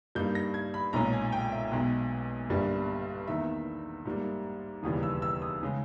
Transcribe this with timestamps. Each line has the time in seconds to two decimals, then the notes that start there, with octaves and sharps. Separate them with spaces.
0.15 G2 G3 A#3 D#4 G6
0.35 A#6
0.54 G#6
0.74 B5
0.93 B1 A#2 G#3 C#4 A#5
1.13 G#5
1.32 G5
1.52 E5
1.71 B1 B2 G#3
2.49 G1 G2 G3 A#3
3.28 E2 D#3 A#3 D#4 E5
4.06 G#2 G3 A#3
4.83 E1 D#2 C#3 E3 G3 D#6
5.03 E6
5.22 E6
5.42 D#6
5.63 C#3 G#3